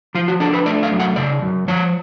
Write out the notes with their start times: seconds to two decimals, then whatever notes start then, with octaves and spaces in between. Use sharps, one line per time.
0.15 F3 F4
0.28 F#4
0.40 D4 A4
0.53 B4
0.66 A3 D5
0.83 F5
0.92 F#2
1.00 F#5
1.16 C#3 D5
1.42 F#2
1.68 F3 C#5